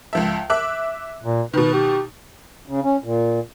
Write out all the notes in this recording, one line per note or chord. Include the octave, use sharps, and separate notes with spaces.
C#2 F3 E5
E5 D6 F#6
A#2
B2 D#3 B4
G4
C#3
C#4
A#2